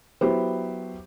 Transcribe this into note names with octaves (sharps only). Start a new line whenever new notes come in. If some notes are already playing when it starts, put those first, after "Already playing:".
F#3 B3 E4 G4 C5